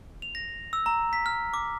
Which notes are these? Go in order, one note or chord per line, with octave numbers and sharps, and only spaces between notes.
F7
A#6
E6
A#5
B6
F6
D6